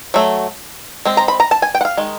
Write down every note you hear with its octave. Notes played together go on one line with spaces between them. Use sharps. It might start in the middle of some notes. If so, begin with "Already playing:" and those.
F#3 A3
G#3 C4
A#5
B5
A#5
A5
G#5
G5
F#5
F5
D#3 G#3